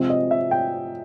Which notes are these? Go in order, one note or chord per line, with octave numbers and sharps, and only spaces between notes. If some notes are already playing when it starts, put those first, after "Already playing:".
Already playing: C3 F3 G#3 C4
D#5
E5
G5